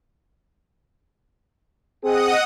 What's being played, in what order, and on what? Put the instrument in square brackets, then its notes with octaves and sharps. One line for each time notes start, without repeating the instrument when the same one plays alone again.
[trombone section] C4 G#4 [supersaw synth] D#5 F#5 D#6